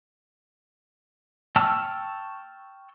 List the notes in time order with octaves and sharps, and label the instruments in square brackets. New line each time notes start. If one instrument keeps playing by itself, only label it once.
[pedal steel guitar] G5 A5 C#6 E6 F6